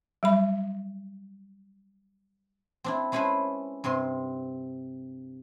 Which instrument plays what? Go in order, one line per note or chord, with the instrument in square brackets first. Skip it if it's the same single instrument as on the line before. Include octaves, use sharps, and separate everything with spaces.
[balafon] F#3 G3 B5
[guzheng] C4 D4 E4
G#3 C#4 E4 A4 B4 C5
G2 C3 C4 C6